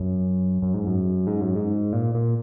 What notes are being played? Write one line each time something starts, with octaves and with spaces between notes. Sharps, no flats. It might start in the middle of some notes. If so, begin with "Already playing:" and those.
Already playing: F#2
F#2
G#2
F#2
G#2
F#2
G#2
A#2
A#2